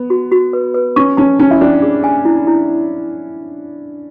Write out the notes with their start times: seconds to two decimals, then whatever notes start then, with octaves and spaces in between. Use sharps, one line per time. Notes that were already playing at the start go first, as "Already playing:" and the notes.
Already playing: B3
0.10 F#4
0.32 F#4
0.53 B4
0.74 B4
0.96 C#4 C#6
1.17 C#4 A5
1.40 C#4 A5
1.51 E4
1.61 C#4 D4
1.82 G#4
2.04 G#5
2.25 E4
2.47 E4